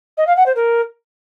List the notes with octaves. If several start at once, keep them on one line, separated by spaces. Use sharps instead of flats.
D#5
F5
F#5
C5
A#4